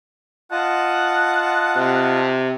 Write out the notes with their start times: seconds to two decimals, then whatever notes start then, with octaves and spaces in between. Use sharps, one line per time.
0.51 F4 D#5 F#5 A5
1.77 C3